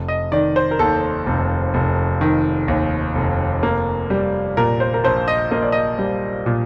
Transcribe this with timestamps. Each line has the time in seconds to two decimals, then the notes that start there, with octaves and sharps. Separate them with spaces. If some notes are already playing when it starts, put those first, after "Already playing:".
Already playing: F1
0.08 D#5
0.32 D#3 D5
0.56 C5
0.71 A#4
0.79 D#2 A4
1.26 F1
1.74 F1
2.21 D#3
2.68 D#2
3.15 F1
3.63 A#3
4.10 G3
4.57 A#2 A#4
4.80 C5
4.94 A#4
5.04 A#1 C5
5.28 D#5
5.51 A#3 D#5
5.62 D5
5.72 D#5
5.98 G3
6.46 A#2